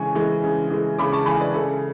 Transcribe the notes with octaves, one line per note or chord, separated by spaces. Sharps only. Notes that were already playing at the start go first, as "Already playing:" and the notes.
Already playing: C#3 E3 G#3 G#5 C#6
E3 G#3
C#3
E3 G#3
C#3 B5 D6
A5 C#6
E3 G#3 G#5 B5
B4 D5
C#3 A4